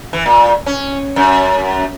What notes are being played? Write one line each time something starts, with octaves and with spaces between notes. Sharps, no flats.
E3
A#2
C#4
F#2